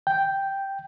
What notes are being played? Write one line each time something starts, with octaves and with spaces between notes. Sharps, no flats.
G5